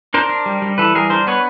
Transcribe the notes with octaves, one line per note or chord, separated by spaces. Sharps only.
D4 A#4 C5
D4
G3
G3
E3 A4 B4
G3 G#4 A#4
D4 A#4 C5
B3 B4 C#5